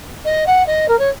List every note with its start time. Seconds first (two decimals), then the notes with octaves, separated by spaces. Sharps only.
0.25 D#5
0.46 F#5
0.67 D#5
0.88 A#4
0.99 C#5